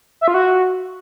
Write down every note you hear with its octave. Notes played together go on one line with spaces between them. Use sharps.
E5
F4
F#4